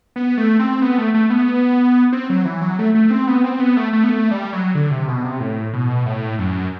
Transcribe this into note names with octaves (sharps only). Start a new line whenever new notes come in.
B3
A3
C4
B3
A3
A3
B3
C4
F#3
E3
F#3
A3
A3
C4
B3
C4
B3
A3
A3
B3
A3
G3
F#3
D3
C3
B2
C3
A2
B2
A2
F#2